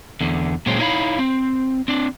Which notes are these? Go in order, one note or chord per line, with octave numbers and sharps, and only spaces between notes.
E2 D3
A#2 F#3 G#3 C4 C#4 C5
D#4 E4 C#5 F5 B5
C4
C4 D4